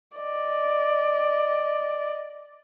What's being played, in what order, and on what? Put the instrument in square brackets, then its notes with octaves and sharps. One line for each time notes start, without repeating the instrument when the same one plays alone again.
[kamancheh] D5 D#5